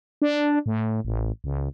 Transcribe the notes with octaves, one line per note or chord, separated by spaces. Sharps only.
D4
A2
A1
C#2